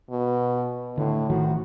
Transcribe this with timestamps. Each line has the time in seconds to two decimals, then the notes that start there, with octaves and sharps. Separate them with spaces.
0.11 B2
0.97 A2 D3
1.30 A1 D#3 F3 F#4